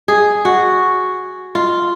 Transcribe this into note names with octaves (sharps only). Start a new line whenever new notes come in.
G#4
F#4
F4